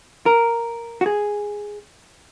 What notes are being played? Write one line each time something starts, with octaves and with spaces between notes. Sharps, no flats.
A#4
F#4
G#4